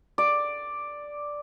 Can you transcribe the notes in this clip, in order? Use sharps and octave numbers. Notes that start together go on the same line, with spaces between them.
D5